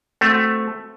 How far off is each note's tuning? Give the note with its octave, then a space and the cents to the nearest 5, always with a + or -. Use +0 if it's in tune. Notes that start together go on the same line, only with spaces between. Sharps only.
A3 +5 C4 +0 F#4 -5